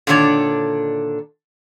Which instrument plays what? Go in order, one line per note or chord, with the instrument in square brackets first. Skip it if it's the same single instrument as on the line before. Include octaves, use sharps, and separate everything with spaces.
[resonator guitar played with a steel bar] A#2 D3 D#3 D4 C#5 D5